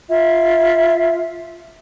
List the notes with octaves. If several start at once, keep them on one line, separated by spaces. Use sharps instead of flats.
F4 E5